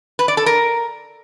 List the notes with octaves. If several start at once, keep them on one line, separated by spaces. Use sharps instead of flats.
B4
D5
A4
A#4